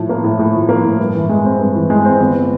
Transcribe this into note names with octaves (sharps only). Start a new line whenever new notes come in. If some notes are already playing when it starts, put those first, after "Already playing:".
Already playing: A2 F3
A#3
A2
A2
F3
A#3
A2
G2
E3
G#3
C4
G2
E3
G#3
C4
G1